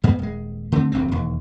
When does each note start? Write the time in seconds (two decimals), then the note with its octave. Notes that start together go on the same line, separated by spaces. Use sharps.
0.04 G2 G3 G#3 B3
0.19 D#1 G#3
0.72 D3 A3 A#3 C4
0.92 D1 A#1 F#2 C4
1.11 E1 D#2